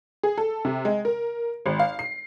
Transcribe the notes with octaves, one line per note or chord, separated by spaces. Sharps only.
G#4
A4
C3
G#3
A#4
G#1
F5
C7